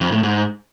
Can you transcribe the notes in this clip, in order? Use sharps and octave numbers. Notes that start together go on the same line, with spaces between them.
F2
A2
G#2